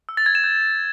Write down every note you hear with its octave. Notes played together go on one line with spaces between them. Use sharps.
E6
A6
G#6
E7
G6